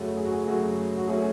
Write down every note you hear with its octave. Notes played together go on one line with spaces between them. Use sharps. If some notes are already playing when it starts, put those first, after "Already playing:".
Already playing: F#2 C#3 F#3 A3
G#4
F#4
G#4
F#2 C#3 F#3 A3 F#4
F#4
F#3 A3 C#4 G#4